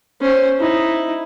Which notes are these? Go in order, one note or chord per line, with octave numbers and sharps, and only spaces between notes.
C#4 C5
D#4 E4